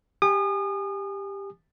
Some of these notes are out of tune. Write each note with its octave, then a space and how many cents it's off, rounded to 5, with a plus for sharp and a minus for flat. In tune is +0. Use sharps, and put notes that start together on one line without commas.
G4 +10 G#5 +0 D#6 -35